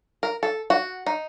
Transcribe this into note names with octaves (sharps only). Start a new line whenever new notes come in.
A#4
A4
F#4
D#4